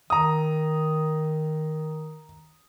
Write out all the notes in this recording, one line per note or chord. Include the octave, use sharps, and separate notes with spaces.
D#3 A#5 D#6